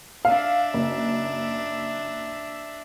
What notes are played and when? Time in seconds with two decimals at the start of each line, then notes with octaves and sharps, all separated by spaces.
0.25 D4 E5 F5
0.74 F#1